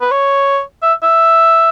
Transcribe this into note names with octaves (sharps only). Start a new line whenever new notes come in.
B4
C#5
E5
E5